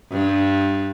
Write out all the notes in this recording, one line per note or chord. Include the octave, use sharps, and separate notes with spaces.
G2